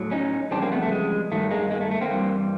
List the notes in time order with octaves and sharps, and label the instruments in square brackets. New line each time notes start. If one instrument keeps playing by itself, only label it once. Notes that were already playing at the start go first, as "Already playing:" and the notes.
Already playing: [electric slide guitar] A2 F#3
C#4 D#4
F2 C#3 E3 G3 C4 D4
A#3 C4
A3 B3
A3
G#3
G2 D#3 F#3 A3
G#3 A#3
G#3 A#3
A3
A3
A#3 C4
G2 E3 G3